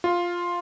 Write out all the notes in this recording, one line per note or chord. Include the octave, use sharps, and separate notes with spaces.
F4